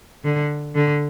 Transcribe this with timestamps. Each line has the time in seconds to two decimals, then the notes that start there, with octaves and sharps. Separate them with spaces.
0.24 D3
0.75 D3